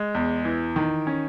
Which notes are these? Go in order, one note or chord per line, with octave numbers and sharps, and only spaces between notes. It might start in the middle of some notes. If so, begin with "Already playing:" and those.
Already playing: G#3
E2
E3
D#3
C#4